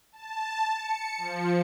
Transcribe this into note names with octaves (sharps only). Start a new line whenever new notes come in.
A5
C#7
F3